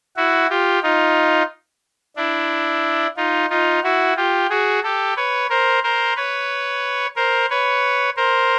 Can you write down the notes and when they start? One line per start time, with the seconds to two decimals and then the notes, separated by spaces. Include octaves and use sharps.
0.16 E4 F#4
0.49 F4 G4
0.83 D#4 F4
2.16 D4 E4
3.17 D#4 F4
3.50 D#4 F4
3.83 E4 F#4
4.16 F4 G4
4.49 F#4 G#4
4.83 G4 A4
5.16 B4 C#5
5.50 A#4 C5
5.84 A#4 C5
6.16 B4 C#5
7.16 A#4 C5
7.50 B4 C#5
8.17 A#4 C5